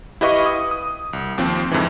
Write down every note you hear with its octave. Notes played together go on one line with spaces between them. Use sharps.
E4 G4 B4 D#5 F5 C#6
D#6
D#6
C2
D#2 F3 C4 C5
F2 G#2 D3 E3